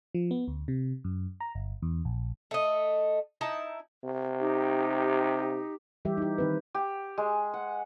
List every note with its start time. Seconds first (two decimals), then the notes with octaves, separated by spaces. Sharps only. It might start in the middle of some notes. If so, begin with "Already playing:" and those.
0.15 F3
0.31 B3
0.48 D2
0.68 C3
1.04 F#2
1.40 A#5
1.55 G1
1.82 E2
2.05 A#1
2.51 A3 D#5
3.41 D#4 E4 A5
4.04 C3
4.39 D#4 G4
6.05 E3 G3 G4 E5
6.17 D#4 G4
6.38 D#3 C4 B4
6.75 G4
7.18 G#3
7.54 F#5